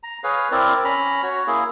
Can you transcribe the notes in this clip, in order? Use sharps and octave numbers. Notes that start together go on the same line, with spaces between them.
A#5
G#4 B4 C#5 F5
C4 E4 A#4 D5
C#4 A#5 B5
F#4 C#5
A#3 E4 G#4